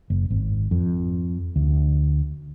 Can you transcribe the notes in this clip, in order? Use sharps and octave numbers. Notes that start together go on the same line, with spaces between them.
F#1
G#1
F2
D2